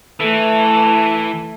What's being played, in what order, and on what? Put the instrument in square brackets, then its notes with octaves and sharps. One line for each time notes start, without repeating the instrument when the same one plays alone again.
[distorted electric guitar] E3 [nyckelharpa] A3 A4